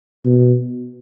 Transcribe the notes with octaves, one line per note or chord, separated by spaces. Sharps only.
B2